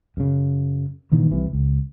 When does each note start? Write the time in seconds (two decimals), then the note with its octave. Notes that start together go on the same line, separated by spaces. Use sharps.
0.17 F#2 C#3
1.12 G2 A#2 D#3 E3
1.31 C2 C3 E3
1.53 C#2